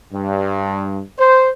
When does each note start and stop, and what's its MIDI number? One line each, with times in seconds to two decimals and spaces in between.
0.13 1.01 43
1.19 1.51 72